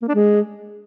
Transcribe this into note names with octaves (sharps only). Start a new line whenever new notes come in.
A#3
D4
G#3